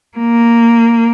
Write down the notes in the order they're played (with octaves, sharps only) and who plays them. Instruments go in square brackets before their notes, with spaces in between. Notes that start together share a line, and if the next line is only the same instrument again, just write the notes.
[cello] A#3